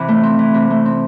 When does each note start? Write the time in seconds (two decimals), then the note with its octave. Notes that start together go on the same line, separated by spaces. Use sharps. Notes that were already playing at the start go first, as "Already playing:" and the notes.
Already playing: C3 E3
0.08 A3
0.23 C4
0.39 E3
0.54 C3
0.70 A3
0.85 C4